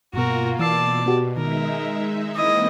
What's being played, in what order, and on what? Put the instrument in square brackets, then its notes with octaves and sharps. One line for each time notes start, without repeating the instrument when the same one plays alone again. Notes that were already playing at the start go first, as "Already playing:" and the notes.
[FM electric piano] G2 B2 [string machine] A#3 F4 [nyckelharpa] F#4 A#4
[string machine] B2 [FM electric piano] E3 E6 C7 [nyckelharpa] D5 A5
[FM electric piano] B3 F#4 G4
[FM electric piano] D#3 [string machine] G#3 D#4 E5 [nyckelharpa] A#4
[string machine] E3 A#3 C4 [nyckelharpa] E4 D#5